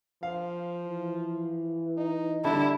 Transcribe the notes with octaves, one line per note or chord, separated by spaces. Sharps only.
F3 F5
E3
D#4
D3 G3 E4 A5